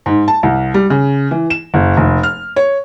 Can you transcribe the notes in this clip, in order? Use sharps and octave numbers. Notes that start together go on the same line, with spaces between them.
G#2
A5
C2
G3
C#3
E3
E7
F#1
F1
F6
C#5